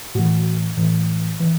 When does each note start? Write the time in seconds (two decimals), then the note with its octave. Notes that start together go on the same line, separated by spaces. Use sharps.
0.15 A2 E3 F#4
0.77 A2 E3
1.40 E3